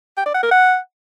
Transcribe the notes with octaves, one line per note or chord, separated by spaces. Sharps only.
G5
D5
F#5
A#4
F#5